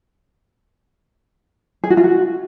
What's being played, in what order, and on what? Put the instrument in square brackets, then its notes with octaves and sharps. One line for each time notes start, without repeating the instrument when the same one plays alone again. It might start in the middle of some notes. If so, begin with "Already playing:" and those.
[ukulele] G#4
F#4
F4
F#4